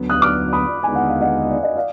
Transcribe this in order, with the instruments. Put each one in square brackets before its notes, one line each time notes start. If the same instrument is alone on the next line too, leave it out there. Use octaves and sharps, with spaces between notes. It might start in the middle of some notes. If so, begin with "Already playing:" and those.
Already playing: [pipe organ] D2 D3 F#3 B3
[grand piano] D#6 F#6
D6 F6
B5 D#6
[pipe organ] D#2 D3 G#3 B3 D#4 [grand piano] G#5
[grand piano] F#5
F5
D#5 F#5
D5
D#5
D5 F5